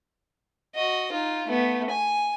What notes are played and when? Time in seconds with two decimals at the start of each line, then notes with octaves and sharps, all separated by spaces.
0.75 F#4 D#5
1.12 D#4 F4
1.48 A3 B3
1.90 G#5